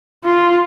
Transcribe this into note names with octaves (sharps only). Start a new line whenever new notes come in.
F4